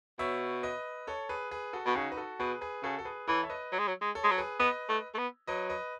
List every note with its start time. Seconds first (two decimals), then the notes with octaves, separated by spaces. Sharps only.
0.19 B2 C#5 E5
0.63 B4 D#5
1.07 A4 C#5
1.29 G#4 B4
1.51 G#4 B4
1.73 F#4 A4
1.86 B2
1.95 C#3 D#4 F#4
2.12 B4
2.17 F#4 A4
2.40 B2 G#4 B4
2.61 G#4 B4
2.83 C#3 F#4 A4
2.99 A4
3.05 G#4 B4
3.28 E3 A4 C#5
3.43 E5
3.50 B4 D#5
3.72 F#3
3.79 G#3
3.88 F#3
4.01 G#3
4.15 A4 C#5
4.24 G#3
4.31 F#3
4.38 G#4 B4
4.60 B3 B4 D#5
4.89 A3
5.14 A3
5.18 B3
5.47 F#3 B4 D#5
5.69 B4 D#5